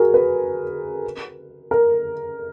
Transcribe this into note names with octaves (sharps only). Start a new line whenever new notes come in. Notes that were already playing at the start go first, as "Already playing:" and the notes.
Already playing: F#4 G#4 A#4
B4
A#4